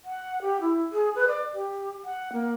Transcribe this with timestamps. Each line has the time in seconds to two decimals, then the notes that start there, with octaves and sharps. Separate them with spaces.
0.04 F#5
0.42 G4
0.61 E4
0.92 G#4
1.15 B4
1.28 D5
1.54 G4
2.04 F#5
2.33 A#3